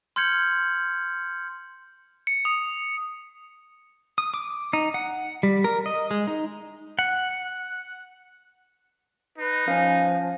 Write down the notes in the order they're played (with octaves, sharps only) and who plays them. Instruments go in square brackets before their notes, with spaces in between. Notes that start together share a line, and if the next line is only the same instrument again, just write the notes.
[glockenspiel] C6 F6 G6 G#6 C#7 F#7
[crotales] C#7
D#6
[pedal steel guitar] D#6
D6
D#4
F#5
G3
A#4
D#5
G#3
D#4
F#5
[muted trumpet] D#4 [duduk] B4
[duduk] F3 [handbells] C#4 G#5 [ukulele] F5